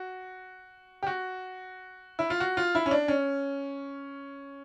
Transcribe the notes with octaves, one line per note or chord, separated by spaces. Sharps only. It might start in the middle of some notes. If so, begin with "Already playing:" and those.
Already playing: F#4
G4
F#4
E4
F4
F#4
F4
E4
C#4
D4
C#4